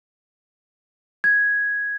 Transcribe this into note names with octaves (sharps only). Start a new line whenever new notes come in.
G#6